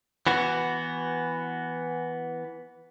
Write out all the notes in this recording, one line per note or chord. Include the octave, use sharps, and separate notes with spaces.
E3 B3 F#4